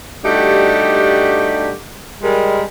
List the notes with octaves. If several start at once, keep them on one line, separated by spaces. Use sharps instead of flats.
G3 A3 D4 D#4 F#4 G4
G3 G#3 A#4